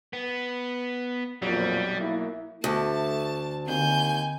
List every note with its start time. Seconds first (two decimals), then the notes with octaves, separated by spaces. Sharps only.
0.13 B3
1.42 B1 F2 A#2 F#3 G3
1.98 A#3 E4
2.64 D2 A3 A5
3.66 D#2 D3 C4 G#5 G6